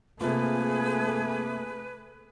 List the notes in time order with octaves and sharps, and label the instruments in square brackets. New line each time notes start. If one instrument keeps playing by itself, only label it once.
[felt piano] C3 A#3 F4 [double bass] A3 [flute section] G#4 [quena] B4